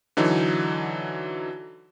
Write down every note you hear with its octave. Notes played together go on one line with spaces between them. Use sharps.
D3 E3 F#3 D#4